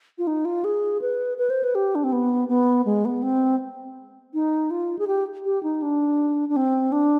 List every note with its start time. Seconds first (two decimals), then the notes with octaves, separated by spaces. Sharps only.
0.18 F4
0.27 D#4
0.45 F4
0.64 G#4
1.02 B4
1.38 B4
1.50 C5
1.63 B4
1.75 G4
1.95 D4
2.04 C4
2.12 B3
2.48 B3
2.86 G#3
3.05 B3
3.22 C4
4.34 D#4
4.71 F4
4.99 G#4
5.07 G4
5.45 G4
5.63 D#4
5.82 D4
6.49 D4
6.56 C4
6.92 D4